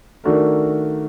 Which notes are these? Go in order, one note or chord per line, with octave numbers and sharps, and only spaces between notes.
D#3 A3 D4 F#4 A#4